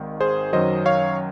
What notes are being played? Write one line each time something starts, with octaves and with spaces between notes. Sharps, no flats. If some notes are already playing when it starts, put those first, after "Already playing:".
Already playing: G#1 G#2 D#3
G#4 C5
F#2 D#3 F#3 C5 D#5
C#5 F5